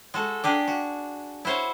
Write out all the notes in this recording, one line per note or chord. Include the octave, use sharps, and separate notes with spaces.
G#3 F#4 A4
D4 G4 G#4
F#4
E4 F#4 C5 C#5 F5